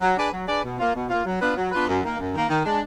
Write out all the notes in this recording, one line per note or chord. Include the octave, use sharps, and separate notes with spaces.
F#3
D4 G#4 B4 D5
F#3
D4 G#4 B4 D5
B2
A#3 F4
B2
A#3 F4
F#3
B3 D4 F4 B4
F#3
B3 D4 F4 B4
F#2
D#3 A#3
F#2
D#3 A#3
D#3
G#3 D4